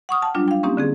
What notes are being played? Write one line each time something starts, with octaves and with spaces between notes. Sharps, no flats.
F#5 C#6 D#6 F6
F#5 G5 A5 F6
F#3 G3 D4 F4
F5 G5
A#3 C4 C#4 D#4 G4
D3 C4 G#4